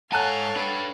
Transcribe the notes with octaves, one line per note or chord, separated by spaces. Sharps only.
G#2 A4 C#5 F5 F#5 G#5 A5 F#6
D4 B4